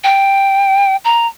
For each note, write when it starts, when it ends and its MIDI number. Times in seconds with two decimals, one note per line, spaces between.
0.04 0.96 79
1.05 1.27 82